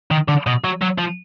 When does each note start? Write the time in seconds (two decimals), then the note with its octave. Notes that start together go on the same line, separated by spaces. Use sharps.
0.11 D#3
0.28 D3
0.47 B2
0.64 F#3
0.82 F#3
0.98 F3